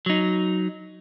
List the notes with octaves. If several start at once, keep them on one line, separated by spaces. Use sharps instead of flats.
F#3 D#4